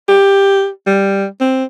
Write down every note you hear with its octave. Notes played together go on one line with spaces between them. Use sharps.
G4
G3
C4